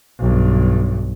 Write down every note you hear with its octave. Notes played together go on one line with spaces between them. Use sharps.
B1 G2